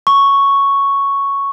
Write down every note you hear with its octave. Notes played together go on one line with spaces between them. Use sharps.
C#6